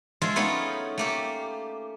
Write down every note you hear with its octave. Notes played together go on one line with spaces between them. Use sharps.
F3 G#3 F4 E5
A3 B3 C#4 D#4
A3 A#3 G4